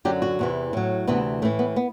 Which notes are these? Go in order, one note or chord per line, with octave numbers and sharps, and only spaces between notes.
F#2 D3 F#3 G4
F#4
E2 C3 E3
A2 F#3
D2 C3 E3 B3
A2 E3 A3
B3
B3